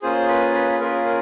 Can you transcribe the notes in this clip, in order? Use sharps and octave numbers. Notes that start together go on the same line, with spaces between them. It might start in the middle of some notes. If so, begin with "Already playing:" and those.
A#3 C#4 F4 G#4 C5
B4
B4
B4
A#3 C#4 F4 G#4 A#4
A#4